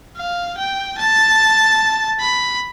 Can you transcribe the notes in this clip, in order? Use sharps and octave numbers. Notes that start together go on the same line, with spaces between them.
F5
G5
A5
B5